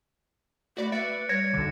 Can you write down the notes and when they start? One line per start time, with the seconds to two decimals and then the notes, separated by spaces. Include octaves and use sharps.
0.77 A3 F#4 D5 B5
0.92 B4 D5 E5 A6 C#7 D7
1.29 G3 C#5 G#6 A#6 C#7
1.54 B1 D3 D6